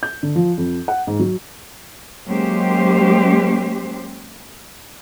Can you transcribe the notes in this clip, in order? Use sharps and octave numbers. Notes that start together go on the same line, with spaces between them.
G6
D3
F3
F2
F#5
G#2
F#3
F#3 G#3 A#3 C#4 G4 C5